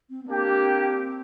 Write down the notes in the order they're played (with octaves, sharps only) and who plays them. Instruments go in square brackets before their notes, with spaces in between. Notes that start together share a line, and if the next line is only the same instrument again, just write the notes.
[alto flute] C4
B3
[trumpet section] A#3 D4 G4 [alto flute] C4